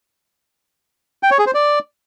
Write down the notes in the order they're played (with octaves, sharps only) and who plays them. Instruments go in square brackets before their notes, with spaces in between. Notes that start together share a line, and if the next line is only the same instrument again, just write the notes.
[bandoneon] G5
C#5
G#4
C5
D5